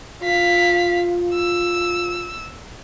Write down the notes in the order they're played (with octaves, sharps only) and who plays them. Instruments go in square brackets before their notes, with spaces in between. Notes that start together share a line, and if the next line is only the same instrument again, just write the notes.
[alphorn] F4 [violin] F5 B6
[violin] E6